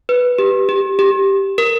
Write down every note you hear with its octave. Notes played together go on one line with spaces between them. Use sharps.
B4
G4
G4
G4
A#4